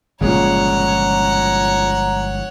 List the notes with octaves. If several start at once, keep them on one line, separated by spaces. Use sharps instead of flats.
G1 A#2 C#3 F3 G#3 C#5 F#5 A#5